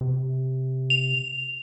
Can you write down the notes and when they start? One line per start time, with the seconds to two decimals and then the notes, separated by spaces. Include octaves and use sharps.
0.01 C3
0.90 F7